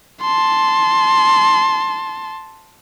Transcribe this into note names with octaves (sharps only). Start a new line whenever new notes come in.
A5 C6